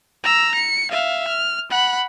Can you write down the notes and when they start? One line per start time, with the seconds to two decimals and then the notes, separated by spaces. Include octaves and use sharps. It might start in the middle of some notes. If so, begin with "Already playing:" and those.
0.24 A#5 E6
0.55 C#7
0.91 E5 F5
1.28 F6
1.70 F#5 B5